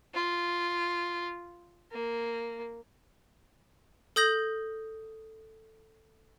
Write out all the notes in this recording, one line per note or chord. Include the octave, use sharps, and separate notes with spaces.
F4
A#3
A4 D#6 G6 A#6 F#7